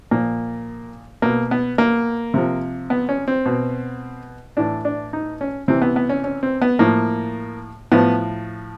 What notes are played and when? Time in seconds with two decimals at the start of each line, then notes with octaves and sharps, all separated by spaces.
0.11 A#2 F3 A#3
1.22 B2 A#3
1.51 B3
1.78 A#3
2.34 C3 F3
2.90 B3
3.09 C#4
3.28 C4
3.46 B2
4.57 A2 E3 D4
4.85 D4
5.13 D#4
5.41 C#4
5.68 C3 E3 C4
5.82 B3
5.96 B3
6.09 C#4
6.24 C#4
6.43 C4
6.62 B3
6.79 A2 F3 A#3
7.92 A2 F3 B3